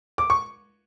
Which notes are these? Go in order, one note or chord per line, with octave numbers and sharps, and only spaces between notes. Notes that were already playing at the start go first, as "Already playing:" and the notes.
D6
C#6